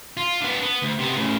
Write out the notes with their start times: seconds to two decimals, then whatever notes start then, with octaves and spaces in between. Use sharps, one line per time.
0.17 F4
0.42 B3 D4
0.62 B3
0.82 D2
0.99 C3 B3
1.17 A2 C#3